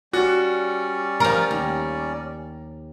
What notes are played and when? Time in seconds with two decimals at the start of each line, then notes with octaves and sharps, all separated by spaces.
0.13 G3 C#4 F#4 D5
1.20 F3 A#4 A#5
1.51 D#2